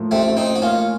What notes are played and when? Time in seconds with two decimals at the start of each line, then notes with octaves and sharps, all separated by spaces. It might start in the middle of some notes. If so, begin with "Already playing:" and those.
Already playing: A2 F3 A#3
0.11 A1 A3 C4
0.37 A1 C4 D#4
0.55 F#4
0.62 A#3 C#4 F4